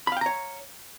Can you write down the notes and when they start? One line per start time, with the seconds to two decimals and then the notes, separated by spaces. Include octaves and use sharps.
0.07 B5
0.12 F5
0.17 G5
0.21 A#5
0.26 C#5